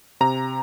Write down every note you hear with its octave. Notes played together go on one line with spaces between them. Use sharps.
C3 A#5